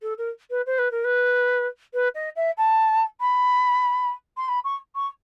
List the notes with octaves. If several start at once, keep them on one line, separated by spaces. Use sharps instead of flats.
A4
A#4
B4
C5
B4
A#4
B4
B4
D#5
E5
A5
B5
C6
B5
C#6
C#6